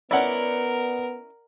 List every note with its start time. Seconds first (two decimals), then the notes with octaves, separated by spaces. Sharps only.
0.11 B3 C#4 E4 A#4 D5 F#5